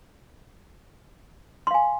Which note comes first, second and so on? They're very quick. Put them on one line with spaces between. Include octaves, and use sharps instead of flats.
C6 F5 G#5